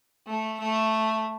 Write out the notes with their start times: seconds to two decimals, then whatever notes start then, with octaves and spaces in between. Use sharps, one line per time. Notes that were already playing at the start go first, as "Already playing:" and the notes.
0.26 A3
0.59 A3